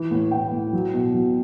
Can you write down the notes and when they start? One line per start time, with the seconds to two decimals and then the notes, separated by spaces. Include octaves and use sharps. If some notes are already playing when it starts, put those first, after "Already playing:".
Already playing: E3
0.11 A2
0.31 A2 G5
0.52 A2
0.73 F#3
0.94 B2
1.14 F#3